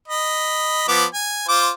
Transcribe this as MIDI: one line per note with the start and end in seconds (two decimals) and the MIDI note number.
0.08 0.87 75
0.08 0.87 83
0.88 1.05 53
0.88 1.05 59
0.88 1.05 86
1.14 1.47 80
1.48 1.70 65
1.48 1.70 72
1.48 1.70 86